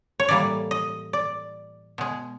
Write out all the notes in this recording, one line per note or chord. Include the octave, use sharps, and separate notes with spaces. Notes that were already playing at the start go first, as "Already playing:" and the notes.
C#5
A2 E3 G3 A#3 D5
D#5
D5
B2 G#3